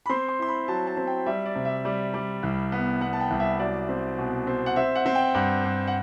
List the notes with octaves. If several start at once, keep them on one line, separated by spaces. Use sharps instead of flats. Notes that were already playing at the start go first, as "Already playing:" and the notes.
B5
C4 C6
C6
E4 C6
B5
F#3 A5
A5
C4
G5
G3 E5
D5
C3
E5
G3
G3
C2
B3
B3 F#5
A5
G5
C2
E5
F#3 D5
C4
B2
C4
F#5
C4 E5
F#5
C4
G5
G2 F#5
G2
F#5